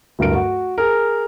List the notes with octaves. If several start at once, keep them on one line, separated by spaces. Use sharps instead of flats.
D1 G2 A#4 D7
F#4
G#4 A#4